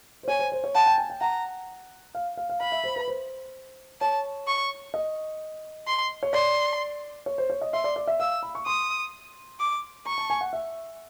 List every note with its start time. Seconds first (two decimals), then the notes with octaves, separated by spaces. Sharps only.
0.23 C5
0.28 C#5 G#5
0.39 C5
0.52 C5
0.64 C#5
0.75 F#5 A5
0.87 G5
0.98 G#5
1.10 G5
1.21 F#5 A#5
2.15 F5
2.37 F5
2.49 F5
2.60 F5 B5
2.72 E5
2.84 C5
2.96 B4
3.08 C5
4.01 C#5 A5
4.47 C#6
4.94 D#5
5.87 C6
6.23 C#5
6.33 D5 C6
7.26 C#5
7.38 C5
7.50 C#5
7.61 D#5
7.73 E5 C6
7.84 D5
7.96 D5
8.07 E5
8.20 F5 E6
8.43 B5
8.55 C#6
8.66 C6 D#6
9.60 D6
10.06 A#5 C#6
10.18 A5
10.30 G#5
10.41 F#5
10.53 E5